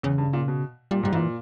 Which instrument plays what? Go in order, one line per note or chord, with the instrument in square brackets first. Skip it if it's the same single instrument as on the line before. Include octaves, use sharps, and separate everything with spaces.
[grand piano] E2 [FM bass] C#3
[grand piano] G2
A#2
B2
[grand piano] A#2 [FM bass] G3
[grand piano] G#2 [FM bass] G3
[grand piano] A#2 [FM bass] E3